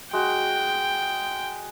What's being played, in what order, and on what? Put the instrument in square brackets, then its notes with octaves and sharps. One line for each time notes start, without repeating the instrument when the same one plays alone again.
[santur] G#3 F#4 [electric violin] G5